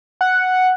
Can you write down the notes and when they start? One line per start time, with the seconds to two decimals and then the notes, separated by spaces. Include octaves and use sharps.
0.21 F#5